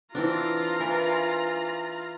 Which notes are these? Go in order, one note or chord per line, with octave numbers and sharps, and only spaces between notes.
E3 C4 D4 F4 A#5
E3 A#4